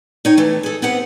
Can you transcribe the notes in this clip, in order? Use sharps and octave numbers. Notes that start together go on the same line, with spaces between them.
D#4 C#5 G5
E3 A3
G#4 A4
B3 C4 G4 B4 F#5